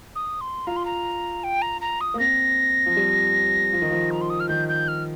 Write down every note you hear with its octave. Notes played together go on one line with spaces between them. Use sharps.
D#6
C6
F4 A#5
C6
A#5
G5
A#5
A#5
D#6
A#3
C4 A#6
F3
G3
F3
D#3
F3
A#5
C6
D#6
F6
D#3 G6
G6
F6